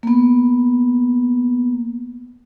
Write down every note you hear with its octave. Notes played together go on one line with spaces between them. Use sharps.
A#3 B3